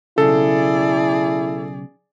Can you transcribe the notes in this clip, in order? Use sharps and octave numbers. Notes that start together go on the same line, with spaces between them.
B1 F2 C#3 E4 G#4 A4 D5